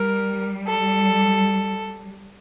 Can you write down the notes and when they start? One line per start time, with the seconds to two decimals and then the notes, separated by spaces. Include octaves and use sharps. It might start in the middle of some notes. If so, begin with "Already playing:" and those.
Already playing: G3 A#4
0.67 A4